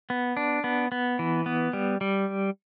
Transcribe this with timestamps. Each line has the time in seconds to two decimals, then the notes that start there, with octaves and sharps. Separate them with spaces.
0.10 B3
0.37 D4
0.64 B3
0.92 B3
1.19 E3
1.46 B3
1.73 G3
2.01 G3